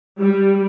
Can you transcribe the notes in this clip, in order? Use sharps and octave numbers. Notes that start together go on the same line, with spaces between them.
G3